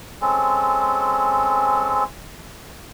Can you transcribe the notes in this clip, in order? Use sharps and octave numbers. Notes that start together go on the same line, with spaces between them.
G#3 C4 C#4 A4